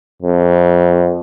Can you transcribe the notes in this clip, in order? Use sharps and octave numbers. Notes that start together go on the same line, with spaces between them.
F2